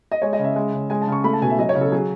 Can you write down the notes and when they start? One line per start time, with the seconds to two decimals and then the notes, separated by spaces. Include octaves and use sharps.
0.12 D#5
0.22 G#3 C#5
0.33 D#5
0.39 C#3
0.44 E5
0.56 G#3
0.74 C#3
0.90 G#3 G#5
1.02 A5
1.07 C#3
1.12 C#6
1.24 A3 B5
1.33 A5
1.42 B2 G#5
1.50 E5
1.59 F#3 D#5
1.69 C#5
1.75 C#3
1.81 A4
1.92 F#3 G#4